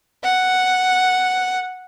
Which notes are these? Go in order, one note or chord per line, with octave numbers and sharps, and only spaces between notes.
F#5